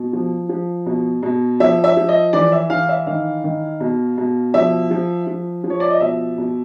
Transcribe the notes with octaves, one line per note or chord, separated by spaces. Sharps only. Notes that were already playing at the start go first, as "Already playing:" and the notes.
Already playing: B2
F3
F3
B2
B2
F3 E5
E5
F3
D#5
E3 D5
E5
E3 F5
E5
D#3 F5
D#3
B2
B2
F3 E5
F3
F3
F3
C#5
D5
D#5
B2 E5
B2